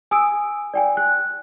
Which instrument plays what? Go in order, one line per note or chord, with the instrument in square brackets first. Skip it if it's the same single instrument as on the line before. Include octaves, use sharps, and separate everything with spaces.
[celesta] G#5 D#6 E6 D7
D5 G5 G#5
F#6